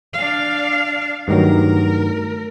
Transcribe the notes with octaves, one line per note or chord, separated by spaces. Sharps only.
D4 F5
G2 D#3 F#3 A3 A#4